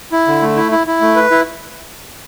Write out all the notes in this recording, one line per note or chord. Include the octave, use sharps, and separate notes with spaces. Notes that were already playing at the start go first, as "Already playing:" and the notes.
E4
D3
A3
E4
E4
E4
A3
B4
E4